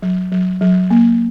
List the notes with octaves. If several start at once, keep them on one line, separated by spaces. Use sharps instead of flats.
F#3
F#3
F#3
A#3